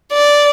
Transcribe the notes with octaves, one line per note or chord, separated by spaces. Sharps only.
D5